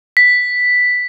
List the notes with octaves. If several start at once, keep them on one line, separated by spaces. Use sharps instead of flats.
B6